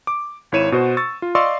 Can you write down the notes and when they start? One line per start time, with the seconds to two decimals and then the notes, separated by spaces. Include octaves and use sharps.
0.07 D6
0.52 G#1 E4 C#5 D#7 E7
0.72 B2 F#4 C5
0.97 C#6 E6 A6
1.22 F4
1.35 D5 D#5 F5 C6 C#6 E6